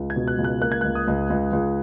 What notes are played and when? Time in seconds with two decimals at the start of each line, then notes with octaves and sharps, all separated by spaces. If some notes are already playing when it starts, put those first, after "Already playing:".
Already playing: C#2
0.10 G#6
0.16 B2
0.28 F#6
0.38 C#2
0.44 F#6
0.61 A#3 F#6
0.72 G#6
0.81 C#2 F#6
0.95 D#6
1.08 C#2
1.30 C#2
1.53 C#2